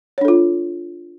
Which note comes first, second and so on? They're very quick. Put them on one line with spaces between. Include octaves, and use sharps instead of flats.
C#5 D4 A4 F4